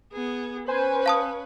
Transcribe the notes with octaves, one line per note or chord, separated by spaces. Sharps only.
B3 G#4
C#4 B4 C5 G#5
F5 A5 D#6